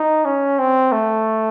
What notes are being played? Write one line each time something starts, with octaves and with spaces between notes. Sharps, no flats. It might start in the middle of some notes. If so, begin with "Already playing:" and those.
Already playing: D#4
C#4
C4
A3